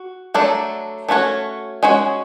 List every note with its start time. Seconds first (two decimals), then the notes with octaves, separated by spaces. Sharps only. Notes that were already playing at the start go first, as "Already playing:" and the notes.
Already playing: F#4
0.34 F#3 A3 D4 A4
1.09 A3 C#4 F#4 C#5
1.83 G#3 C#4 F#4 C#5